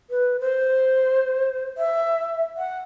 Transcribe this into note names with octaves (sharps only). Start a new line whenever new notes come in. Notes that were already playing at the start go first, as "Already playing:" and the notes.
B4
C5
E5
F#5